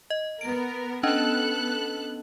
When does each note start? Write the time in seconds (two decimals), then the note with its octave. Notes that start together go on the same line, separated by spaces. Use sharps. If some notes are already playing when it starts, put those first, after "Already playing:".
0.10 D#5
0.41 B3 A#4 D7
1.03 B3 C#4 D4 A4 D#5 F#6